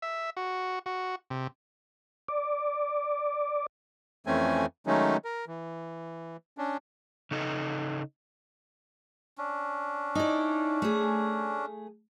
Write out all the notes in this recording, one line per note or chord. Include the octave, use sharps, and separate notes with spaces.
E5
F#4
F#4
C3
D5
F2 E3 A3 C4 C#4 G#5
D#3 F#3 G#3 A3 C#4 D#4
A#4
E3
C#4 D4
C#3 D#4 A4 D#5
C#4 D4
D#4 E4 D5
A3 G#4